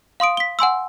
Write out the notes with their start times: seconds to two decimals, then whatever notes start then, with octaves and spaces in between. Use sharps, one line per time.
0.20 F5 C6 D#6 D7
0.37 B6 G7
0.59 F#5 G#5 C6 E6